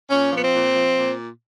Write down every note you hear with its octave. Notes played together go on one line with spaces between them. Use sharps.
A#2 C#4
F3
B3
C4
A#2
F3
A#2